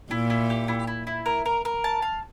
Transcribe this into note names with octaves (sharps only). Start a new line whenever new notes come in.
A#2 E4
E4
G4
E4
E4
E4
A#4
A#4
A#4
A5
F5